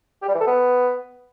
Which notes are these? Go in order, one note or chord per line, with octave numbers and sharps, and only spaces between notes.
G4
G3
E3
A4
B3